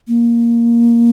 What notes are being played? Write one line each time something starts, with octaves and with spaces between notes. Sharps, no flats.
A#3